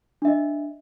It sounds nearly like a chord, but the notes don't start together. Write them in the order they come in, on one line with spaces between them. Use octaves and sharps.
D4 E5 D#5